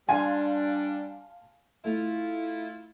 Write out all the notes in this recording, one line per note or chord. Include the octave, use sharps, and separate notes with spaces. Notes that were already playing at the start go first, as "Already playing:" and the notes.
G3 D4 F5 G#5 A5 C6
A3 E4 F4